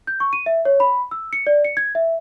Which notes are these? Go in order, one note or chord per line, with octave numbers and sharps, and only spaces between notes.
G6
C#6
D#7
E5
C#5
B5
E6
C#7
D5
C#7
G#6
E5